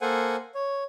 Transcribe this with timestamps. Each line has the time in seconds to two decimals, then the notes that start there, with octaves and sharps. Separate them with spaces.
0.01 A#3 A4 C5 F#5 G#5
0.55 C#5